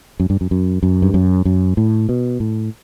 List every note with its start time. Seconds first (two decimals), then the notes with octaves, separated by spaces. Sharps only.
0.20 F#2
0.30 G2
0.41 F#2
0.51 F#2
0.83 F#2
1.02 G2
1.14 F#2
1.45 F#2
1.77 A2
2.09 B2
2.40 A2